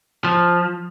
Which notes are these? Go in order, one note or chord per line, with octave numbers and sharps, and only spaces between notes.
F3